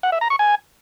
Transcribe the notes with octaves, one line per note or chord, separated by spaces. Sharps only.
F#5
E5
A#5
C#6
G#5